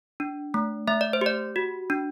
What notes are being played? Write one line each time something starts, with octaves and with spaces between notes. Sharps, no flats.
D4
A3
A3 E5
D5
C5
G4 D5
F#4
D4